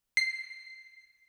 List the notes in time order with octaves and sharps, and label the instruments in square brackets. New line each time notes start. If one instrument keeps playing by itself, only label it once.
[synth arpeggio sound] C7